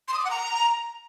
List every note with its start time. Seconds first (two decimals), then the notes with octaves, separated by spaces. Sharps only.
0.08 C6
0.14 D#6
0.19 D6
0.25 F#5
0.30 A#5